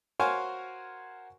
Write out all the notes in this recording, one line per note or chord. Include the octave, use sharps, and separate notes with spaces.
F#4 A#4 C5 C#5 F5 G#5